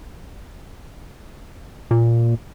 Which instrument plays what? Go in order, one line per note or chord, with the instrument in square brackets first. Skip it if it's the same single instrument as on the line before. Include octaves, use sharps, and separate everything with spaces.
[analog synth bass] A#2